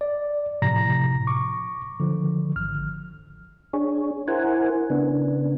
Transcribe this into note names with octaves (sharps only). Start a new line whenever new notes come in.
D5
A2 C3 F3 A#5 A#6
C#6 D6
D3 F3
G#1 F6
D4 G#4 C#5
E4 A#4 C5 F#5 G#5
C#3 B3 D4